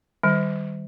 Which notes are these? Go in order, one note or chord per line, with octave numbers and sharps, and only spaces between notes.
D#3 G3